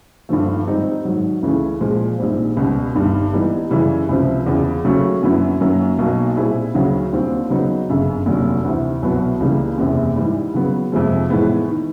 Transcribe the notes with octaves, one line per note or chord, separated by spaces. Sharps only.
G2 D3 F3 A3
G#2 D#3 G3 C4 D#4
G#2 D#3 F#3
C#2 C#3 E3 A3
A#2 F3 G#3
A#1 G#2 D#3 G3 C4
C#2 B2 G3
G1 G2 D#3 G3
G#2 E3 G3 B3 D#4
F#2 C#3 E3 G3
C#2 C3 F3
E2 C#3 F3
C#3 F#3 A3 C#4 F#4
F#2 D3 F#3 B3 E4
F#2 D#3 F#3 A#3
B1 B2 F#3 A#3
A#2 G3 C4 E4 G#4
D2 C#3 F#3
D#2 D3 G3 C4 F4
C#3 F#3 B3 D#4
G1 F#2 C#3
F1 D#2 D3 F#3
D2 C3 E3
C2 B2 F#3 B3
C#2 C#3 E3 G3 A#3
F#1 E2 C3
G#2 E3 G3
C#3 F#3 B3
F2 C3 F3 G#3
A2 E3 G#3 B3
D#3